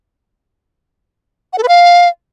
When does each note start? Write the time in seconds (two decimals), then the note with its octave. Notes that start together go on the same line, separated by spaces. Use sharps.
1.53 F#5
1.58 A4
1.63 B4
1.68 F5